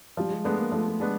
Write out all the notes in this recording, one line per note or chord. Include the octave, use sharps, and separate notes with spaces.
F3 G3
G#3
G#3 A3 B3 D4
A#3
F3 A3
A3
G#3 B3 D4